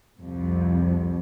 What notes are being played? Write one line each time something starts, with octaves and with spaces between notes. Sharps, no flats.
C2 F2